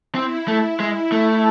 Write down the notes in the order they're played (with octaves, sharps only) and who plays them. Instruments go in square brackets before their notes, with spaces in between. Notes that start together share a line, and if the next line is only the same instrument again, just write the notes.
[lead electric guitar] C4 [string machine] E4
[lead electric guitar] A3
G#3
A3